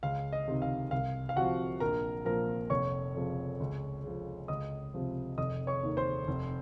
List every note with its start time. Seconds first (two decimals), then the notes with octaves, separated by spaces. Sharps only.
0.03 C#2 F5
0.33 D#5
0.48 C3 D#3
0.62 F5
0.91 C2 F5
1.29 F5
1.36 C3 F3 F#4 F#5
1.80 A#1 A#4 A#5
2.25 A#2 F3 A#4 A#5
2.70 F1 C#5 C#6
3.14 F2 C#3 F3
3.60 C#2
4.04 C#3 F3
4.48 C#2 D#5 D#6
4.94 C3 F3
5.38 F1 D#5 D#6
5.67 C#5 C#6
5.83 D#2 D#3
5.97 C5 C6
6.28 F1